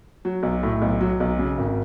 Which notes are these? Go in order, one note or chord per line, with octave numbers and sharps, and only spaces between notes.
F#3
B1
A2
B1
F#3
B1
C#3
G#1